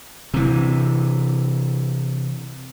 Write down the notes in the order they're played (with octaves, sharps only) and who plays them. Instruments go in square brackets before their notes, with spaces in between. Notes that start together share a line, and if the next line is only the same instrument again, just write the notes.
[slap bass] C3 E3